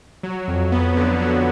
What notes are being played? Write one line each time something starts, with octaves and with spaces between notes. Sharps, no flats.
F#3
F2
B3
D3
F#3